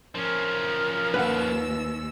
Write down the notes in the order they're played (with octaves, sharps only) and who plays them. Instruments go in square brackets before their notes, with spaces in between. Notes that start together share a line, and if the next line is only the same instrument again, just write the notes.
[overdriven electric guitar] F3 C#4 [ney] A#4
[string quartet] D#2 E6 [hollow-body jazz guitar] B4 F5 F#5